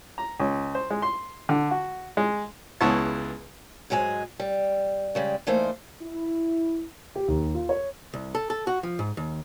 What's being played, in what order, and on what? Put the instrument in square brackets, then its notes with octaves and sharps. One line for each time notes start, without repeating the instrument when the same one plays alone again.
[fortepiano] A#5
C#2
C5
G#3
C6
D3
F#4
G#3
C#2 B3 E4 G#4 C#5 A5
[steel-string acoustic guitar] G#2 F#3 G#3 C5 G#5
G3
C#3 G3 G#3
E3 A3 A#3 D#4 C5 D5
[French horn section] E4
[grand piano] G4
D#2
F4
C#5
[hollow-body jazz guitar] C2
A4
A4
F#4
F3
G#2
D#2